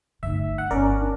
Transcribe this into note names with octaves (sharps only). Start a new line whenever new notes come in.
G1 A3 D#4 E5
F#5
G1 C#4 A#4 D5
D4